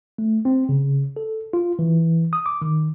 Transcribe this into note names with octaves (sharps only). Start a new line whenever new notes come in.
A3
C4
C#3
A4
F4
E3
D#6
D6
D#3